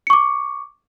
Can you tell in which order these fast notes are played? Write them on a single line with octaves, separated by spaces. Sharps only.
C#7 C#6 D6